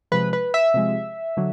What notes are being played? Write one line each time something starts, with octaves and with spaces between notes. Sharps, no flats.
C3 F3 G#3 B4
B4
E5
C3 F3 G#3
D3 F#3